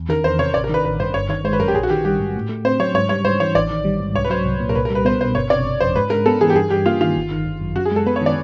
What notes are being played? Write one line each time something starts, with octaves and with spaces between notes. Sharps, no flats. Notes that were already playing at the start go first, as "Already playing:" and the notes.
Already playing: E2
D#3 A#4
E2 C5
C3 C#5
A1 D5
A#4
D#3 B4
A1 B4
G2 C5
G1 C#5
D#3 C#5
G#3 C5
B4
F#2 A#4
G4
A#1 G#4
F#4
D#3 G4
G3 G4
G#2
A2
A3
C4 C5
F#3 C#5
G#2 C#5
G3 C#5
G#2 C5
E3 C#5
A1 D5
D#3
G3
G#2
C2 C#5
B4
F#3 C5
C2
A#2
A#4
C2 B4
A#4
G3
B4
B3 C5
B2 C5
G1 C#5
C3 D5
G1
F2 C5
G#2 B4
G#3 A#4
B3 A4
E3 G#4
G4
G2 G#4
G3 G4
A#3 F4
D#3 F4
G1
D#3
G1
F#2
F#2 F#4
G#4
G#3 A4
B3 B4
C#5
D#3 D5